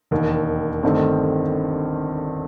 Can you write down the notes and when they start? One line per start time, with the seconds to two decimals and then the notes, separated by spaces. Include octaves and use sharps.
0.11 E1 D#2 D#3
0.83 G1 G2 D#3 A3 C4